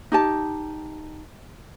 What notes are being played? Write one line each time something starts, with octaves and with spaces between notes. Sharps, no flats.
D#4 G4 A5